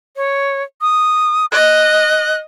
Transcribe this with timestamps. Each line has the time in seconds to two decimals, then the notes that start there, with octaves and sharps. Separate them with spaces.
0.16 C#5
0.81 D#6
1.52 D#5 F#6